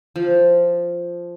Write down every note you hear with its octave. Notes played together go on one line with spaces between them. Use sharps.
F3